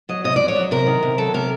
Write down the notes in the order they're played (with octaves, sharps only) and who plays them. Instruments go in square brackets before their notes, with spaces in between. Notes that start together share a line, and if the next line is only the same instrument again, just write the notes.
[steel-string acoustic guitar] F#3 D#5
C3 D#5
F2 D5
C#5
F#3
C3 A#4
D#3
C3
F#3 A4
C3 A#4